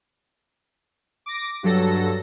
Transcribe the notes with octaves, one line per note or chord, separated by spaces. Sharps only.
D6 A#6
G2 F#3 A4 A#6